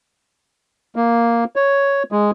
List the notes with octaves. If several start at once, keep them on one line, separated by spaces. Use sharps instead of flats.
A#3
C#5
G#3